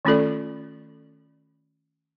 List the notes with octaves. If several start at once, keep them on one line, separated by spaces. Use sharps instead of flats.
D#3 A3 C#4 F4 A4 D5